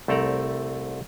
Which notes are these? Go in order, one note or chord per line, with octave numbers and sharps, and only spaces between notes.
C2 A3 C4 A4 D5 A#5